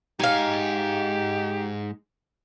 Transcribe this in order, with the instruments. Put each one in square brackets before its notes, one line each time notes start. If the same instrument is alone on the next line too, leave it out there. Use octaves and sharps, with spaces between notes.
[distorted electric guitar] G#2 G#5 [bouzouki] D#4 F5 [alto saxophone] G4